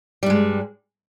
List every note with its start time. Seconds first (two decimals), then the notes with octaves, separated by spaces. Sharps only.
0.23 G3
0.26 G2
0.30 G#3